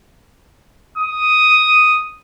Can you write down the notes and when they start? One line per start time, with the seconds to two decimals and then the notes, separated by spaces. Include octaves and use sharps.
0.97 D#6